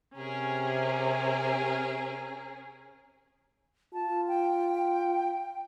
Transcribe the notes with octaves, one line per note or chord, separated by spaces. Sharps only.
C3 C#4 G#4 A#4
F4 A5
G5